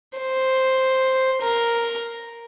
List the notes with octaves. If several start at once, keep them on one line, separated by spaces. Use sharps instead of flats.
C5
A#4